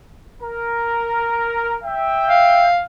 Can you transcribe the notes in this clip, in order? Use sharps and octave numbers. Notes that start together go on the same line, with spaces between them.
A#4
E5 G5
F5